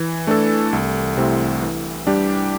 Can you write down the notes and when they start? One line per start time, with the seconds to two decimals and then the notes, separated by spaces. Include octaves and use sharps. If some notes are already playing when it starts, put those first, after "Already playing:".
Already playing: E3
0.27 A3 D4 A4
0.73 C2
1.17 C3 A3 C4 E4
1.62 E3
2.07 G3 D4 G4 D5